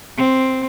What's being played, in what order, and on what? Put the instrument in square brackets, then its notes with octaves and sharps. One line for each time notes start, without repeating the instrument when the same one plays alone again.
[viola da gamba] C4